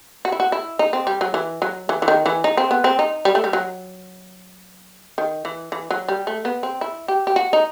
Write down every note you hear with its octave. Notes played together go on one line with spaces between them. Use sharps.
F#4
E4
F#4
E4
D#4
C4
G3
F#3
E3
F#3
E3
E3
D#3
E3
D#4
C4
B3
C4
D#4
G3
A3
G3
F#3
D#3
E3
E3
F#3
G3
A3
B3
C4
E4
G4
G4
F#4
D#4